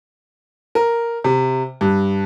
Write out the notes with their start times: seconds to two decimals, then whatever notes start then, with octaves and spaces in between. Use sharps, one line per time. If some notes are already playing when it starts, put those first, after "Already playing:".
0.75 A#4
1.24 C3
1.81 G2